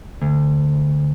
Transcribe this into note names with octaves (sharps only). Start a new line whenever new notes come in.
D2